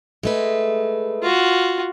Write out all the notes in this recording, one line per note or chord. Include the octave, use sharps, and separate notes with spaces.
G#3 A3 B4
F4 F#4